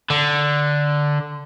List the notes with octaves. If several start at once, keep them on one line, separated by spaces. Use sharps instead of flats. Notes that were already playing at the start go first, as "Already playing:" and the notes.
D3